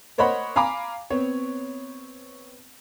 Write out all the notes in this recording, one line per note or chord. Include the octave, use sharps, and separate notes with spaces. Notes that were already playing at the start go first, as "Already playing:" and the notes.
A#4 C5 C#5 D#5 F#5 B5
F5 G#5 A#5 B5 D6
B3 C4 C#5